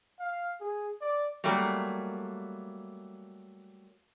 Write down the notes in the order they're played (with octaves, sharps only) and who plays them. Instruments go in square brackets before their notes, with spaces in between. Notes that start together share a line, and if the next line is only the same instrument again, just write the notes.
[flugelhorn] F5
G#4
D5
[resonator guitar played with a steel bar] F#3 G3 A3 A#3